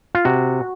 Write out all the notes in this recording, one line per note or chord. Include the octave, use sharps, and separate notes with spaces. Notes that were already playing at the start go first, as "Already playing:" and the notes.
F4
C3 F#4